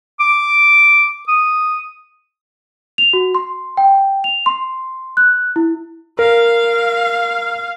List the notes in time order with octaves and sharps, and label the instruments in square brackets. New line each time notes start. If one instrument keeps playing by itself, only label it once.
[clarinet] D6
D#6
[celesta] F7
F#4
C6
G5
F7
C6
F#6
E4
[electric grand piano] A#4 [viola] F5